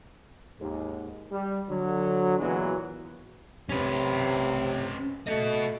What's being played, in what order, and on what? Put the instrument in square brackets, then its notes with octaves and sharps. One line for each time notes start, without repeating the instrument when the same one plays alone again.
[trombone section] D#2 G#2
G3
D3 F#3
A#2 E3 F#3 G#3 B3
[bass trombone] C3 [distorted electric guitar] C#4 B4
[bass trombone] A3 [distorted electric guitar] F#4 D#5